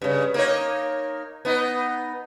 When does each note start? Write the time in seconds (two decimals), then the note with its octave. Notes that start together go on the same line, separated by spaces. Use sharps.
0.02 G2 C#3
0.34 A#3 D#4 C#5
1.45 B3 D#4